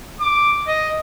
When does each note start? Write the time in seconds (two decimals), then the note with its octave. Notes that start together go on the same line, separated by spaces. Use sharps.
0.20 D6
0.67 D#5